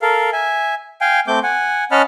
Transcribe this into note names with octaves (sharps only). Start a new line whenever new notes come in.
A4 A#4 F5
E5 G#5
F5 G5 G#5
A3 C4 D6 G6
F#5 G#5
C#4 D#5 F#5 A5 B5 F6